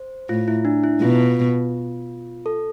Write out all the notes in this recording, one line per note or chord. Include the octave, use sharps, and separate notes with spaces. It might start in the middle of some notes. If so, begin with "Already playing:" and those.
Already playing: C5
A2 F4
E4
D4
E4
B2 F4
A4